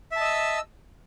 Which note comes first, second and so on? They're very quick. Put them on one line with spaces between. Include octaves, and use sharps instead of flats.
E5 A5 D#5 E6